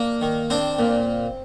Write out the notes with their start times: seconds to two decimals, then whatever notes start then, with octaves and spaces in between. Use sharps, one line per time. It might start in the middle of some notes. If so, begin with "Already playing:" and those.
Already playing: A#3 D4
0.21 D#3
0.50 C4 D4 C5
0.79 A#2